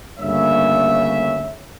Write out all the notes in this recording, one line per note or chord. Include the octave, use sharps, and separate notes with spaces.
D2 G2 C#3 A#3 C#5 E5